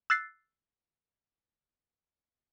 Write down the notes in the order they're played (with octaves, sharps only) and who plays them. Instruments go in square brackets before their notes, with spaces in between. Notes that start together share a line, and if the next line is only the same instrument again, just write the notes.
[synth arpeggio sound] E6 F#6 A6 C7